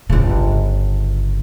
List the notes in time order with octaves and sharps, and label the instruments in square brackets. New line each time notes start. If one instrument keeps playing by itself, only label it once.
[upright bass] G1 C#3